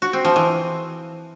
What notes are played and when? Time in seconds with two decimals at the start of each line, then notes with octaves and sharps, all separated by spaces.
0.02 F#4
0.13 C4
0.25 F3
0.36 E3